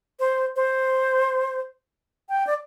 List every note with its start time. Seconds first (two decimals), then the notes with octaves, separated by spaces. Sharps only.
0.20 C5
0.56 C5
2.29 G5
2.47 D5